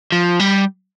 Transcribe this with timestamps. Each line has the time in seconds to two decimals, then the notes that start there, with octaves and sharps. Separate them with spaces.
0.12 F3
0.40 G3